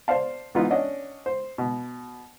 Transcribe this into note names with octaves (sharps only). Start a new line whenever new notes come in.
C5 D5 F5 A5
G#2 E3 B3 D#4 F4
C#4 D4 D5 D#5 F#5
C5
B2